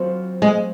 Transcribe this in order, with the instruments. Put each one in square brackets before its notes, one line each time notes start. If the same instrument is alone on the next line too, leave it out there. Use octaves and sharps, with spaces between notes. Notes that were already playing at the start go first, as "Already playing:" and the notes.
Already playing: [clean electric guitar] F#3 C4 F4 C5
[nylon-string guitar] G#3